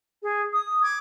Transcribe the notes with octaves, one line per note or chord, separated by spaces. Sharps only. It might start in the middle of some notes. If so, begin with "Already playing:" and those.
G#4
D#6
D6 G#6